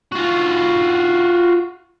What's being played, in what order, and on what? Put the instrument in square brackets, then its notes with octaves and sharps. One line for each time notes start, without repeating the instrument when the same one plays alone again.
[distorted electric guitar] F4 F#4